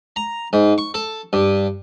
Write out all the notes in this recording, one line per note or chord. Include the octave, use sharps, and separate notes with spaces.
A#5
G#2
C#6
A4
G2